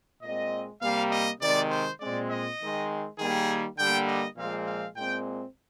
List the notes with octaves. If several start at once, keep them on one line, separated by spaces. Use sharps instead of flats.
A#2 G#3 C4 D#5
C3 G3 A#3 F5
D#5
C3 D#3 G#3 C4 D5
C5
A#2 G#3 C4 D5
D#5
D#3 G#3 C4
D#3 G3 A#3 G#4
D3 G3 A#3 G5
D#5
A#2 F3 G#3 C4 F5
F5
A#2 G#3 C4 G5